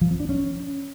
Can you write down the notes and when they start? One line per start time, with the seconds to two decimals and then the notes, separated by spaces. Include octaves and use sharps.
0.01 F3
0.11 C4
0.20 D4
0.29 C#4